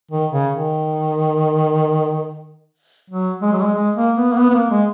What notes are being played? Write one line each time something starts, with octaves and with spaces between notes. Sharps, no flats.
D#3
C#3
D#3
F#3
G#3
F#3
G#3
G#3
A#3
B3
A#3
B3
B3
A#3
G#3